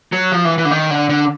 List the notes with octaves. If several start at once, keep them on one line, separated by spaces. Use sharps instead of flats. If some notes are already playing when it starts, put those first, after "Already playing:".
F#3
F3
E3
E3
D3
D#3
D3
D3